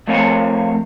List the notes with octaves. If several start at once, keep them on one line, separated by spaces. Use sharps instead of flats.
F3 A3 C4 A#4 C#5 F5